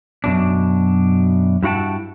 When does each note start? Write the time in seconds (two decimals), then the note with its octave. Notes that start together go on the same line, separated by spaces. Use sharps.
0.24 F#2 B2 D4
1.63 G2 E4 F#4 F#5 G5 A5